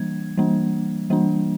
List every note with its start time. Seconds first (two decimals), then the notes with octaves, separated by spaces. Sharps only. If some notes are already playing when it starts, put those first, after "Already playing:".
Already playing: E3 G3 A#3 D4 G#6
0.38 E3 G3 A#3 D4
1.10 E3 G3 A#3 D4